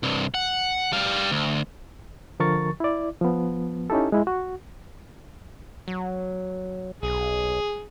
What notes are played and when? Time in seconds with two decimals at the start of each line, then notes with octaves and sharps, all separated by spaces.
0.03 C2 G2
0.34 F#5
0.93 G3 F5
1.32 D2
2.40 D3 F3 A#4 C#6 A6
2.80 E4 D5
3.21 F3 B3
3.90 C#4 D#4 E4 G4 A4
4.12 G#3 E4
4.27 F#4
5.88 F#3
7.03 B1 G#4